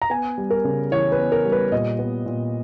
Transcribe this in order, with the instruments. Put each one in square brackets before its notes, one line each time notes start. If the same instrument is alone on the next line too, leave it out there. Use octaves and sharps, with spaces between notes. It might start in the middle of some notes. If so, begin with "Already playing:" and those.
[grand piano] A#5
B3 G#5
G3
A#4
C#3
E3 C#5
B4
B3
A#4
G3
B4
A#2 D#5
B3
A#2